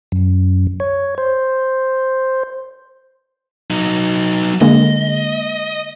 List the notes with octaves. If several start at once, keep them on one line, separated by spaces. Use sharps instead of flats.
F#2
C#5
C5
F#3 D#4
D3 G#3 A#3 D#5